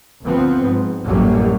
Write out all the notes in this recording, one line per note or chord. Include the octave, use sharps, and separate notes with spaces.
D2 F3 B3 C4
G#2
A1 F#2 A2 F#3 G3 A#3